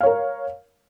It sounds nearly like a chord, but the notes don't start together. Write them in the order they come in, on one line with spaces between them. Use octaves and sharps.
F5 C#5 A#4